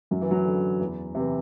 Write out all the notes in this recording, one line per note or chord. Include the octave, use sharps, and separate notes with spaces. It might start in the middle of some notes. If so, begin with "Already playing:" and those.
F#2 F#3
E3
F#3
D3
E2
C3 E3